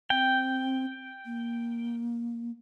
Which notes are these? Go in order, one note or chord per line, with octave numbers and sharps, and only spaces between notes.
C4 G5
A#3